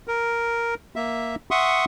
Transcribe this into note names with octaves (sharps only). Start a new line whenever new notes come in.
A#4
A#3 E5
E5 F#5 C6 C#6 D#6